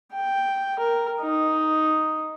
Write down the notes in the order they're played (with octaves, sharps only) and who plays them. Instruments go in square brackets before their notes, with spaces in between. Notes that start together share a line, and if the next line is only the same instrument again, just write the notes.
[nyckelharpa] G5
A#4
D#4